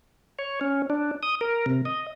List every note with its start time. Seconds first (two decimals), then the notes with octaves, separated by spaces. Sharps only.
0.39 C#5
0.61 C#4
0.90 D4
1.23 D#6
1.41 A#4
1.66 C3
1.85 D#5